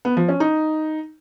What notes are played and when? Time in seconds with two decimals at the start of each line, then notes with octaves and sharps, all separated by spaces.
0.05 B3
0.17 F3
0.28 C#4
0.40 D#4